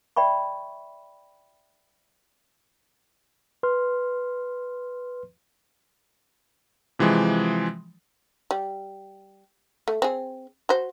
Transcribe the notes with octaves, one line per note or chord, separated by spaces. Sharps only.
D5 E5 G5 B5 C#6
B4 C6 F6
C3 E3 F3 G#3
G3
A3
C4 G#4
F#4 C5